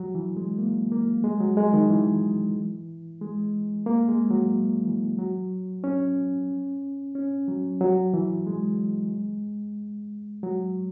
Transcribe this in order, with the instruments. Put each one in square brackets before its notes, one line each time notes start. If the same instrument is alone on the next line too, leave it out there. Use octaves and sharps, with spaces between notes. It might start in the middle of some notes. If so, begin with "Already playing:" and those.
Already playing: [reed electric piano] F#3
E3
G#3
A#3
A#3
G#3
F#3
G#3
D#3
E3
G#3
A#3
G#3
F#3
E3
F#3
C#4
C#4
F#3
F#3
E3
G#3
F#3